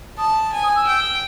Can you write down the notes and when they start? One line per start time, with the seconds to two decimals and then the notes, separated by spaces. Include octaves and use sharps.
0.17 A5 D#6
0.53 G#5
0.63 D#6
0.76 E6
0.87 G5